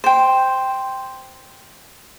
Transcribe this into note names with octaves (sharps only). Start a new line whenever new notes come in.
C5 G5